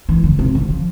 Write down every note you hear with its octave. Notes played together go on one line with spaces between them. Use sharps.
E3
D3
C3
D3
F3